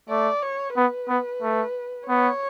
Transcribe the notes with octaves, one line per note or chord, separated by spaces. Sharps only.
A3 D5
C#5
B3 B4
B3
A3
B3 C#5